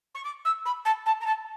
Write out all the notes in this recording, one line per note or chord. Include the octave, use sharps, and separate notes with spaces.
C#6
D6
E6
B5
A5
A5
A#5
A5